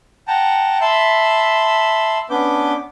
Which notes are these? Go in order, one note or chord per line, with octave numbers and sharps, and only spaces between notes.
F#5 G5 A5 A#5
E5 A5 B5 C6
B3 C#4 D4 B4 D6 G6